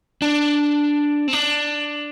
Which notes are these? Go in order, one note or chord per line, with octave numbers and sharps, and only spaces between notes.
D4
C4
D4